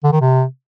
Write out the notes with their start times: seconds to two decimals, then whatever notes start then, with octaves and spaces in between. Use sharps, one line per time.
0.04 D3
0.12 D#3
0.21 C3